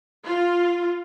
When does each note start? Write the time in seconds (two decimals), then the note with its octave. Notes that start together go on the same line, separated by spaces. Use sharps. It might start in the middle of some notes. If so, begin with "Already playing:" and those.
0.23 F4